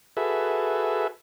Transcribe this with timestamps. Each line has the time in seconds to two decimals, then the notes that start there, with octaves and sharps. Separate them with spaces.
0.17 F#4 G#4 A4 B4 E5